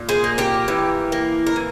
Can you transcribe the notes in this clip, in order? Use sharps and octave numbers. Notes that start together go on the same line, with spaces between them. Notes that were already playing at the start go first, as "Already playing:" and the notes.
Already playing: A#2
G#4 C5
A#3
G4 A#4
E3
A#3
A#4
E3